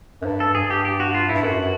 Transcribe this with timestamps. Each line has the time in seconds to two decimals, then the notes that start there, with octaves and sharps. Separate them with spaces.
0.22 F#2
0.26 G2
0.40 A4
0.55 G2 G#4
0.70 G4
0.85 G4
1.00 F#4
1.14 F4
1.29 G2 E4
1.44 F#2 F#4